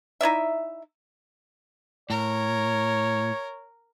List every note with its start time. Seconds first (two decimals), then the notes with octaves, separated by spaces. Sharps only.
0.21 D#4 E4 D5 E5
2.10 A2 A#4 C#5